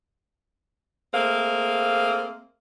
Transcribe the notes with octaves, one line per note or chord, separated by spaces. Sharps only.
A3 A#3 C4 G#4 F5